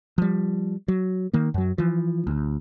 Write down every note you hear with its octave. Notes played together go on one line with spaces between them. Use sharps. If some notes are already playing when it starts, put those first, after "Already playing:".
F3 G3
F#3
D#3 A#3
F#2 F#3
E3 F3
D2